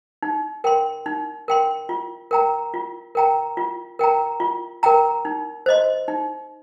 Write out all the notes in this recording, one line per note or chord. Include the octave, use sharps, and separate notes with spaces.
D#4
A#4 G5 C6
D#4
A#4 G5 C6
F4
A#4 G5 A#5
F4
A#4 G5 A#5
F4
A#4 G5 A#5
F4
A#4 G5 A#5
D#4
C5 D#5 C6
D#4